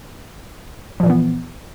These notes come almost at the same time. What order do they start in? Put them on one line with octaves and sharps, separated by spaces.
F3 A#2 E3 B3